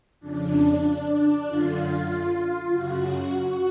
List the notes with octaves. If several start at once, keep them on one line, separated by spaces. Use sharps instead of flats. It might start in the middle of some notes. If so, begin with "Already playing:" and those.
F2 C#3 D4
F#2 D3 F4
F#2 C#3 F#4